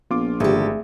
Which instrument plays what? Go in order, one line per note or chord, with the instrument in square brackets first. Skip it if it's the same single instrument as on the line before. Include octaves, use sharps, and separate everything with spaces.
[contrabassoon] A#1 [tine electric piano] B3 [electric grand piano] F4 D6
[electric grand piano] G#1 [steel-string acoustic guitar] D3 G4 [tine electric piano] A3 G#4 E5